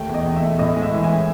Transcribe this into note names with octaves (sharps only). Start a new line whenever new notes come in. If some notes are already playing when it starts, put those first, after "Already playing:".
Already playing: D#2 A3 G5
E2
D#5
E2
E5
A3
A2 D#5
G#3
E5
E3
G#5
C#4